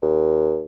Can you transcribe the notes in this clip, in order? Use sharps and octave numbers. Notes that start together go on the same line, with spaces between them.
D#2